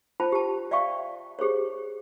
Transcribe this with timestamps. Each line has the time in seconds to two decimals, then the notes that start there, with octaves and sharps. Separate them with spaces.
0.20 F4 C5 G5 A5 B5
0.32 G4 A5
0.71 D5 E5 F5 G5 C#6
1.39 G4 G#4 C5 C#5